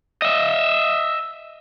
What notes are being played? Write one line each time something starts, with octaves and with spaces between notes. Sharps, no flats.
D#5 E5